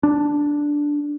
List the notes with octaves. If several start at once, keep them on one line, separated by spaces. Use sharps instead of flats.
D4